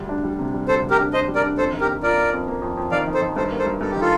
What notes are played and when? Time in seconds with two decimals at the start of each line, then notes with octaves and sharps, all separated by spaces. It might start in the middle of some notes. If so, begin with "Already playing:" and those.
Already playing: D2 G3
0.09 D4
0.24 G3
0.39 C3
0.54 G3
0.68 D2 A4 C5
0.84 C3
0.90 G4 A#4
0.98 D4
1.13 D4 C5 D#5
1.28 G3
1.35 A#4 D5
1.43 D4
1.58 F2 A4 C5
1.73 D#3
1.80 G4 A#4
1.87 A#3
2.03 F4 A#4 D5
2.17 A#3
2.33 F2
2.48 A#3
2.62 F2
2.77 F2
2.91 D#3 D5 F5
3.07 D#3
3.14 A4 C5
3.21 D#3
3.36 G2 A4 C5
3.51 A#3
3.58 A4 C5
3.66 G2
3.81 G2 A4
3.91 G4
3.96 D#3
4.01 F4 A4